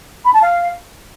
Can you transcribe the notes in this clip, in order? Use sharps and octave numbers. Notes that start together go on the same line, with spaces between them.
B5
A5
F5